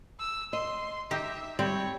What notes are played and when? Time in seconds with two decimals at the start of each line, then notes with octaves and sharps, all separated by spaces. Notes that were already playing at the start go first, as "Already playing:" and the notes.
0.20 E6
0.53 D#5 C6
1.11 D#4 G4 E5
1.59 G3 C4 C#5